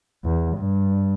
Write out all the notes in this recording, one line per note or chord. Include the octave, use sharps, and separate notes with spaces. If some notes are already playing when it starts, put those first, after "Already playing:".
E2
G2